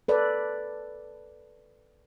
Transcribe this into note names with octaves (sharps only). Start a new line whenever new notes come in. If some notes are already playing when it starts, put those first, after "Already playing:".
A4 B4 D5